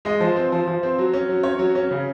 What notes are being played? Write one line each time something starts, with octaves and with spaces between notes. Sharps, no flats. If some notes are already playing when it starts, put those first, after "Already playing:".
G#3 D#5
F3
C4
F3
F3
C4
F#3
C#4
F#3
C#4 C#5
F#3
C#4
C#3